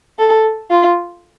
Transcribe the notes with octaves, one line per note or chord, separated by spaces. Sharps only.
A4
F4